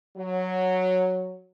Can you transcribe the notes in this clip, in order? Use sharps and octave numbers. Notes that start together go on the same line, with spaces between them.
F#3